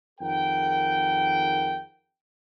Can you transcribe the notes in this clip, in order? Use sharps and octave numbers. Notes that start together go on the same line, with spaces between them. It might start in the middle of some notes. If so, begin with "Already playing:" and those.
F2 D#3 G#4 A#4 F#5 G5